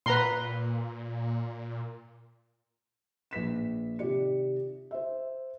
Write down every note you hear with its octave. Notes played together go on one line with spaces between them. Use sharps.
A#2 B4 A#5 C6
A#1 B4 B6 E7
C3 D#3 F4 G4 D5 C#7
C5 E5